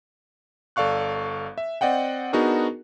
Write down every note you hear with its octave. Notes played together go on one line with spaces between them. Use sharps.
G1 A4 D5 F5 C#6 F#6
E5
C4 D5 D#5 F#5 G5
B3 D4 D#4 F#4 G#4 A#4